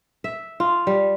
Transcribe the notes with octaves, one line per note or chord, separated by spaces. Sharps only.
E5
F4
G3